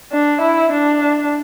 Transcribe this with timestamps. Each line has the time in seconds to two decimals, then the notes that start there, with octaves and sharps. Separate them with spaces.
0.12 D4
0.42 E4
0.73 D4